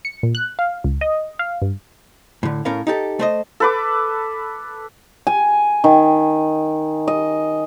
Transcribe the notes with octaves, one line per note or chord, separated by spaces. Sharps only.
C#7
A#2
F#6
F5
C#2
D#5
F5
G2
A2 D3
A2 C#4 A#4 F5
D#4 G4 A4
A3 C5 D#5
A4 B4 D6
G#5
D#3
D#5